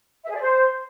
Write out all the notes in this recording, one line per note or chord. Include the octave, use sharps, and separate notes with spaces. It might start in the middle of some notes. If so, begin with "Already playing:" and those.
E5
G#4
D5
C5